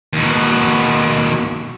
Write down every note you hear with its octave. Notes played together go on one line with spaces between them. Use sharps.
D#2 B2